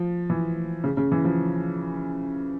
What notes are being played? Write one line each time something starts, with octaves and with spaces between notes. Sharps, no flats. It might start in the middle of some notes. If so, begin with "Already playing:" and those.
Already playing: F3
E3
C#3
C#3
E3
F3